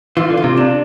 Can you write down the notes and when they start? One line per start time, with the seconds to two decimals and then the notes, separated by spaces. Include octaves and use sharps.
0.17 E3 F4
0.30 D3
0.37 F4
0.44 C3
0.57 D4